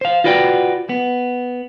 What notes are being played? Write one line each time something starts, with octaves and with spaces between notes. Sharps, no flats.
C5 F5
F4 F#4 B4 D5 E5 G5
B3